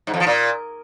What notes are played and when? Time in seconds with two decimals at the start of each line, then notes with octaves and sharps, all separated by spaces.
0.07 G#2
0.14 F2
0.20 F3
0.27 A#2